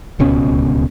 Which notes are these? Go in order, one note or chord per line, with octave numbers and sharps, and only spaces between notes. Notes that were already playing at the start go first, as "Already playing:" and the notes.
D1 C#2 B2 C#4